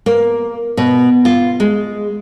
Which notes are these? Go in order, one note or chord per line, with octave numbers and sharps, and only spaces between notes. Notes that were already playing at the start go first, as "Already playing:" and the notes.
A#3
B2
F4
G#3